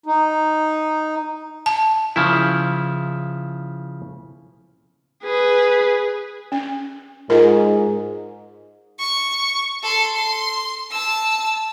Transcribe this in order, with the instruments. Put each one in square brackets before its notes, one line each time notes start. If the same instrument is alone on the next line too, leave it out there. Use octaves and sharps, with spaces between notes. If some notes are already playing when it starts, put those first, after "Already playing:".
[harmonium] D#4
[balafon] A5
[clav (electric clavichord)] C#3 F3 E4
[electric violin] G#4 B4
[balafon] C#4
[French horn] G#2 [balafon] F4 A#4
[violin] C#6
A4 C6
C6
A5 E6